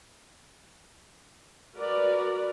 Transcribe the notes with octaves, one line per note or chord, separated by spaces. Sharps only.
F#4 A#4 B4 D5